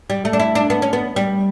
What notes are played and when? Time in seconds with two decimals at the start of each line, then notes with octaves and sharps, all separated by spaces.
0.10 G3
0.25 A3
0.33 D4
0.40 E4
0.55 D4
0.70 B3
0.82 C#4
0.93 B3
1.16 G3